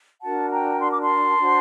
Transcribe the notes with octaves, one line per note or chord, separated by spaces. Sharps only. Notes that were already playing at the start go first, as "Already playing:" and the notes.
D4 F#4 A#4 F#5 A5
G5 A#5
C6
D6
A5 C6
D4 F#4 C5